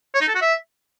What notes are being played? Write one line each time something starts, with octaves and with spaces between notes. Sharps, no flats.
C#5
D#4
A4
F#4
E5